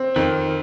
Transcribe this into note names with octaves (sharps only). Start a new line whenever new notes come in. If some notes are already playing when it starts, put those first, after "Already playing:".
Already playing: C4
F2 D#3